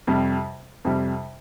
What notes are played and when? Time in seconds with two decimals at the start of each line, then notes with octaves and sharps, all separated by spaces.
0.07 F2 C3 G3
0.85 F2 C3 G3